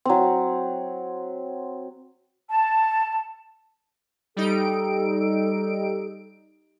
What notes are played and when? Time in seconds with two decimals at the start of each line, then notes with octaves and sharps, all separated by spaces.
0.05 F#3 C4
2.49 A5
4.36 G3 D#4 A4 D7